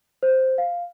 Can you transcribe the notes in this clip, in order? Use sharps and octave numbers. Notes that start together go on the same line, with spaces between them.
C5
F5